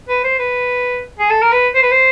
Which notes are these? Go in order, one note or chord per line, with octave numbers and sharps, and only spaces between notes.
B4
C5
B4
G#4
A4
A#4
B4
C5
B4
C5